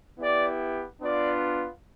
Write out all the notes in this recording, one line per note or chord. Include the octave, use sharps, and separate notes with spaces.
B3 E4 G4 D5
B3 D4 F4 D5